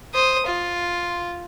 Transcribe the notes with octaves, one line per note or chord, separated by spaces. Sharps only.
C5 D#6
F4